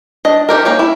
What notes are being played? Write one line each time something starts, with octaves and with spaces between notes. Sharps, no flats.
D4 D#5
D#3 G#3 G4 A#4
A#3 C#4 G4 C#5
E4